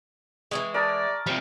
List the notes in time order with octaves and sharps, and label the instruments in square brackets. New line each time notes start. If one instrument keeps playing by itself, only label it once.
[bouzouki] E3 G3 G#3 [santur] C#6
[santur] A#4 A5 D#6 [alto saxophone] D5
[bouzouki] F3 [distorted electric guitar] G3 C4